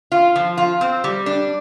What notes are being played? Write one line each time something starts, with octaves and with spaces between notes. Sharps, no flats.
F4
F3
F4
C4
G3
D4